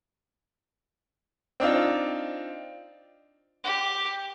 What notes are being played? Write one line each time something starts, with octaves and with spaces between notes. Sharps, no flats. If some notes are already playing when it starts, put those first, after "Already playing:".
C4 D4 D#4 F4
G4